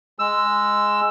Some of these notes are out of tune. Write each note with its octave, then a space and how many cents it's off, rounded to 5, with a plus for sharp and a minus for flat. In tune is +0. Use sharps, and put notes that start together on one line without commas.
G#3 +0 E6 +10